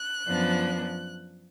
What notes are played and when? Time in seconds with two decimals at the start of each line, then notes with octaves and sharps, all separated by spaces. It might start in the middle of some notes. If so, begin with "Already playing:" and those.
Already playing: F#6
0.26 F#2 F3 B3 D4